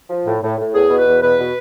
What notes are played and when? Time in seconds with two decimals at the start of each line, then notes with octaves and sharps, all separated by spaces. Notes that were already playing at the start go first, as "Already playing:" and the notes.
0.09 F3
0.26 A2
0.42 A2
0.58 A2
0.73 E2 G#4
0.89 B2
0.98 B4
1.05 E2
1.21 B2 B4
1.37 B2